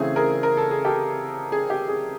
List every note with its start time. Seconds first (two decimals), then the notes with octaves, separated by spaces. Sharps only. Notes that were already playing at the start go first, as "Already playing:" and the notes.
Already playing: C#3 E3 A3 C4 G#4
0.16 G#4 A#4
0.43 A#4
0.57 A4
0.71 G#4
0.85 G4 A4
1.52 G#4
1.70 G4
1.88 G#4